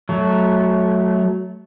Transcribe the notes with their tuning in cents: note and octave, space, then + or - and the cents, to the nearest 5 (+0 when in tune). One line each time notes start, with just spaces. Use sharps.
F#3 +0 A3 -15